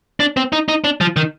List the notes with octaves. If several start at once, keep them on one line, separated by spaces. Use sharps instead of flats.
D4
C4
D#4
D#4
D4
F3
D#3